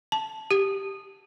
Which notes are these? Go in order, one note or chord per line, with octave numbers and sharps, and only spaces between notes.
A5
G4